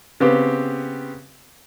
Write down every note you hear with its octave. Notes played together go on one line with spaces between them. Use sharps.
C#3 B3 C4 G4